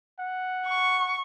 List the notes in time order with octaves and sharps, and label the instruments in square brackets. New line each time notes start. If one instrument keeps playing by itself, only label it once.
[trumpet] F#5
[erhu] C#6